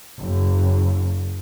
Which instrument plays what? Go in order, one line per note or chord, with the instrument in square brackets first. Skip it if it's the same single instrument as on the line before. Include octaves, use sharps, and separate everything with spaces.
[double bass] F#1